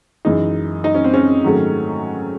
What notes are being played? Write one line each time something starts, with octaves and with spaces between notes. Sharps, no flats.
F#2 E3 G#3 D#4
D#4
C#4
C4
C#4
G#2 D#3 F#3 A3